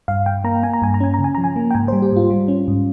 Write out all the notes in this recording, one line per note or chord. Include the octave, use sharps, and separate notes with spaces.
G2 F5
G2 G5
A#3 A#5
A#3 G#5
A#5
G2 G#5
A#5
C#4 G#5
C#3 A#5
G#5
F3 A#5
G#5
A#3
G5
G#2 G#5
G3 C5
G4
G#2 F4
G3
C#4
G#2